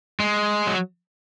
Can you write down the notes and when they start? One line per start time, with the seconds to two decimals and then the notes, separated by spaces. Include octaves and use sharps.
0.20 G#3
0.67 F#3